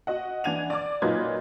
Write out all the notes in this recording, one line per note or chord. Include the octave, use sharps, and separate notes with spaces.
F#4 D#5 F#5
E3 D4 F#5 G#6 D#7 F7
D5 D6
A#2 F#3 D#4 F4 B4 G#6